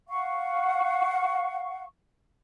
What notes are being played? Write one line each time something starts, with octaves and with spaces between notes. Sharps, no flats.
F5 F#5 C#6